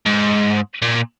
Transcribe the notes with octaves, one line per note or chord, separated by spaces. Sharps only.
G#2
A#2